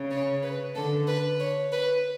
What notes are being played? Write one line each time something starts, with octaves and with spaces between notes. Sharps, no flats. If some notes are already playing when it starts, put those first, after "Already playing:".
Already playing: C#3
C#5
B4
D3 A4
B4
C#5
B4